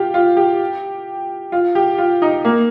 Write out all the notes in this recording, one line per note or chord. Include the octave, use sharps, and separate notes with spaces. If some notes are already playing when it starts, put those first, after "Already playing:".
Already playing: F4 G4
F4
G4
F4
G4
F4
D#4
A#3